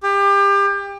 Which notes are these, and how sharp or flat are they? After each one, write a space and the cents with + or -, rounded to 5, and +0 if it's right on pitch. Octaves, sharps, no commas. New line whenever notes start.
G4 +30